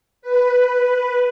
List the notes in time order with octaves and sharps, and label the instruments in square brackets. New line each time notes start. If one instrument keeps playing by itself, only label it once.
[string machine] B4